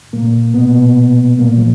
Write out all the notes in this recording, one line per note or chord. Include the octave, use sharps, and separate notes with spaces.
A#2 A#3
B2 B3
A#2 A#3
F3